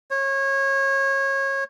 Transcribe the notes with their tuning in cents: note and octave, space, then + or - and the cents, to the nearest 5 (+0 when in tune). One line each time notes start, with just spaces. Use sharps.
C#5 -25